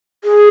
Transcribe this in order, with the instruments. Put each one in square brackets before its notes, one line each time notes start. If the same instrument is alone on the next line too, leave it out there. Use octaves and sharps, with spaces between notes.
[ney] G#4